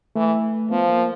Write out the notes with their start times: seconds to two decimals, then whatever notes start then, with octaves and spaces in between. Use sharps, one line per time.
0.16 E3 A3
0.71 F3 B3
0.89 A#3